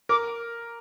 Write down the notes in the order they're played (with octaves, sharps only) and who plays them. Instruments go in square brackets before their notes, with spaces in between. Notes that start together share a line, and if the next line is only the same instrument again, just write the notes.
[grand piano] A#4 [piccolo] D6